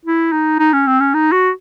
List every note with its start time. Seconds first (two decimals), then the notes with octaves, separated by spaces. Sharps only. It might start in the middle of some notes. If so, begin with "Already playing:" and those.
0.05 E4
0.32 D#4
0.59 D#4
0.73 C#4
0.87 C4
1.00 C#4
1.14 D#4
1.32 F#4